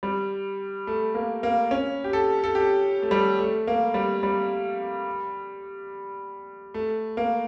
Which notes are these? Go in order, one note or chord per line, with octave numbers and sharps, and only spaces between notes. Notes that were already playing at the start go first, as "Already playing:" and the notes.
G3
A3
A#3
A#3
C#4
G4
A4
A4
G4
A3
G3
A3
A#3
G3
G3
A3
A#3